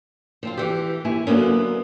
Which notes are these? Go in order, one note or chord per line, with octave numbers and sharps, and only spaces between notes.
F3 C4 F4
E3 G4
D#2 E4 G#5
D3 F#3 A#3 B3 C#4